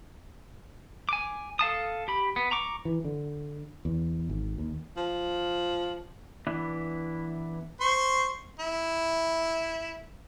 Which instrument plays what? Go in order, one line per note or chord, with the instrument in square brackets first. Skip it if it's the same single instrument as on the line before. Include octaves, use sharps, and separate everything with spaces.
[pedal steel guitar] G#5 D6
A4 F5 A5 D#6
G4 B5
B3
A#5 C#6 D6
[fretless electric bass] E3
D3
E2
G#1
D#2
[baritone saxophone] F3
[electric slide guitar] E3 B3 D4 E4
[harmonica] C5 C6 C#6
E4